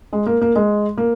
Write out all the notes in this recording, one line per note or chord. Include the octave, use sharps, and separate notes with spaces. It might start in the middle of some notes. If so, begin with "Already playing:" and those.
G#3
A#3
A#3
G#3
A#3